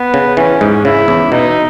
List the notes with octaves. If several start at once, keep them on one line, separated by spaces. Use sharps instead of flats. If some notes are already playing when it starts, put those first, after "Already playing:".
Already playing: B3
C#3
E3 C#4
G#2
C#3 E4
E2
B2 D#4